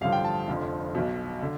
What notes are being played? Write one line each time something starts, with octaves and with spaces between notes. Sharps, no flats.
A1 G2 D3 F3 F5
G5
A5
F1 F2 D3 F3
B1 B2
D3